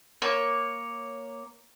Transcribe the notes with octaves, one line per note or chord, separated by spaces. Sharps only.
A#3 C#5